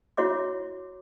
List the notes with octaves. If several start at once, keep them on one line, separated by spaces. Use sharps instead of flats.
E4 F#4 C#5 E5 D6